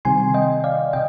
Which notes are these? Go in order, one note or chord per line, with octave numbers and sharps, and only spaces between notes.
C3 D#3 G3 C4 G#5 C6
D#5 G5
D5 F5
C3 D#5 G5